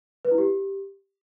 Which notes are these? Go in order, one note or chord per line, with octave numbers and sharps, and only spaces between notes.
B4
E4
G4